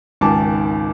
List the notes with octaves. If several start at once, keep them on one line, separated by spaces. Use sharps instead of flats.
G#1 C#2 D#3 G#5 A5 D6